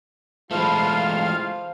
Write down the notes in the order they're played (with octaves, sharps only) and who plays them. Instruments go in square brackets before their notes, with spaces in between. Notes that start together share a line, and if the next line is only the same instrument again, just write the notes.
[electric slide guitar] E3 G#3 A3 [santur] F3 B5 [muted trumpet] F4 [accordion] F5 F6